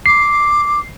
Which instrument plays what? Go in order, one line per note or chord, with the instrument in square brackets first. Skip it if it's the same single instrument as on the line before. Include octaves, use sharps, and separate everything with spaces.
[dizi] D6 [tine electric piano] C7